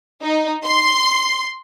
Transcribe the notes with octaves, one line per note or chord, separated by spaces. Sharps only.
D#4
C6